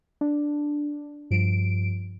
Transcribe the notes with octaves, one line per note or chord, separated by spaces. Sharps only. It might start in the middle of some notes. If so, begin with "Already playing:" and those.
D4
G2 F3 D7